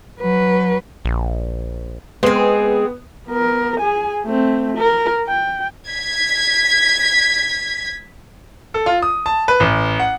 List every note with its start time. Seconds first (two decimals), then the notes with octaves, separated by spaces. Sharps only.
0.21 F#3 B4
1.05 A#1
2.23 G#3 B3 C4 G#4
3.28 B3 A#4
3.80 G#4 G#5
4.24 A3 C4
4.78 A#4
5.27 G5
5.88 G#6 B6
8.74 A4
8.86 F4
9.02 D#6
9.26 A5
9.48 B4
9.60 A1
9.99 F#5